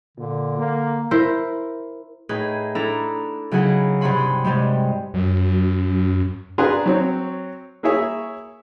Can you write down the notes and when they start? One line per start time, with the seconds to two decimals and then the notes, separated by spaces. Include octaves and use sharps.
0.17 A#2 D3
0.58 A#3
1.11 E4 A#4 C5
2.29 A2 D#4 G#4 B4
2.75 D4 E4 A4 A#5
3.51 C#3 F#3 D#4 E4 G#4 F#5
4.01 G2 C3 F#5 G#5 B5 C6
4.44 G2 C3 G3 G#3
5.14 F#2
6.58 D4 G#4 A#4 B4 F5 C6
6.86 F#3 C4 C#5
7.83 A#3 E4 G#4 C#5 E5